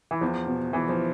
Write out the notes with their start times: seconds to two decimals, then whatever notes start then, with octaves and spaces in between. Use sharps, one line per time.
0.11 E3
0.21 E2 F3
0.47 B2
0.72 E2 E3
0.89 F3